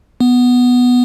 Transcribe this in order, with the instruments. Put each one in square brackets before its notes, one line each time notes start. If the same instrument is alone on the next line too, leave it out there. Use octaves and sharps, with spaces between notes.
[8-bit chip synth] B3